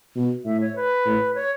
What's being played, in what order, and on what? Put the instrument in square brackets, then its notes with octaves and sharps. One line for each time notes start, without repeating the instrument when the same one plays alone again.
[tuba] B2
[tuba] A2 [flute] E5
[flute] C#5
B4
[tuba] A2
[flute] C#5